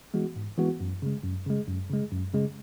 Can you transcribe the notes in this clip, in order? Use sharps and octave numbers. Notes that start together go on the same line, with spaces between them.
E3 G#3 B3 F#4
G#2
E3 G#3 B3 F#4
F#2
C#3 G#3
F#2
C#3 G#3
F#2
C#3 G#3
F#2
C#3 G#3